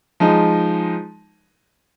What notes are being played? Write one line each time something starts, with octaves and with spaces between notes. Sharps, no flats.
F3 G#3 D#4